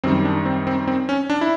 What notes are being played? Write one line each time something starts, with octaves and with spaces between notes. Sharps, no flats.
F#2 D#3 G3 C4
D4
C4
C4
C4
C#4
D4
E4